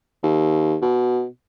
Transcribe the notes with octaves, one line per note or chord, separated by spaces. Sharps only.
D#2
B2